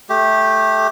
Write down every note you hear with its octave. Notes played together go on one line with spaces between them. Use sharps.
A3 G4